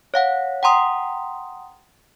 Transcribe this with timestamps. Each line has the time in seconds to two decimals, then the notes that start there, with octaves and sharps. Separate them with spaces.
0.14 C#5 F5 F#5
0.63 F#5 G5 A#5 C6 D#6